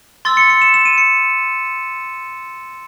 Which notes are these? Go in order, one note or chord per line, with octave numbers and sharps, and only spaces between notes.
C6 E6 A6
C#7
C#7
E7
E7
D#7
C#7